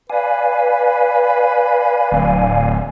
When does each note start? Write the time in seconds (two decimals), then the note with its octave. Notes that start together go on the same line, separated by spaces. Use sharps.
0.10 B4 D5 F5 G#5
2.12 D1